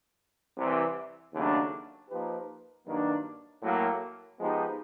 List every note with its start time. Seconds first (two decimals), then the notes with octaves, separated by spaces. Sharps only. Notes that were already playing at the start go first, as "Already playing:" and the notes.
0.57 C2 C3 E3
1.34 D#2 C#3 F#3 A3 D4
2.09 F3 A#3 D#4 G4 B4
2.86 G2 D#3 F#3 A#3 D4
3.62 A2 F#3 A#3
4.39 F3 G#3 B3 D#4 G4